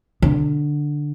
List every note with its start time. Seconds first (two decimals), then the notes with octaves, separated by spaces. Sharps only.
0.22 D3